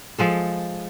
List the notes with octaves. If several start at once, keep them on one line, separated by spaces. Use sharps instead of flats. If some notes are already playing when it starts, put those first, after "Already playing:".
F3 G#3 A4